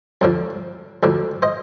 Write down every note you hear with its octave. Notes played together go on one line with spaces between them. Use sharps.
F2 D3 F3
D2 D3 F3
C5 D#5